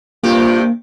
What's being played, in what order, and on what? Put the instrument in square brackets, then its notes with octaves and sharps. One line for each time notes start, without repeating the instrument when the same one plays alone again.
[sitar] G2 C3 G4 [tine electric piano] A#3 [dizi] F4